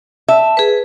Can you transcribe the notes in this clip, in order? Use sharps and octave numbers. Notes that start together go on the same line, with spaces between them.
E5 A5
G#4 B4